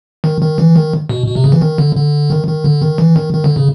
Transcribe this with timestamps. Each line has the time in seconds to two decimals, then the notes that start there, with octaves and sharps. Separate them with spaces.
0.24 D#3
0.41 D#3
0.58 E3
0.76 D#3
1.09 B2
1.26 B2
1.36 C3
1.44 C#3
1.52 E3
1.61 D#3
1.78 D3
1.96 D3
2.30 D#3
2.48 D#3
2.64 D3
2.82 D#3
2.98 E3
3.16 D#3
3.33 D#3
3.44 D3
3.57 C#3